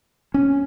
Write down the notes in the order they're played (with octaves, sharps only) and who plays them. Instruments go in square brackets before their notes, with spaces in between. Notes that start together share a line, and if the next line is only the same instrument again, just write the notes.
[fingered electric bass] C#4